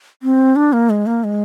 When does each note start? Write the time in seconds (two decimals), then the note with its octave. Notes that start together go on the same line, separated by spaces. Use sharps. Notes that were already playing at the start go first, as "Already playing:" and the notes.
0.23 C4
0.56 D4
0.73 A#3
0.90 G#3
1.06 A#3
1.24 G#3